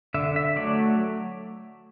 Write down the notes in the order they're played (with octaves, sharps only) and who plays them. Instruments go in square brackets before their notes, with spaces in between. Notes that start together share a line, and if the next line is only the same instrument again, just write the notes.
[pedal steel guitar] D3 E5
E5
F#3 A3 D5